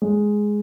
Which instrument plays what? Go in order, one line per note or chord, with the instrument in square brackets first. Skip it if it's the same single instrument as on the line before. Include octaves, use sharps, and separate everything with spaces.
[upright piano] G#3